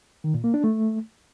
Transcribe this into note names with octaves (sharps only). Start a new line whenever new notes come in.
D#3
A#2
A#3
D4
A3